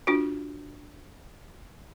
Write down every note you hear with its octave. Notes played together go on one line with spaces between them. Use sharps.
D4 F4 F#4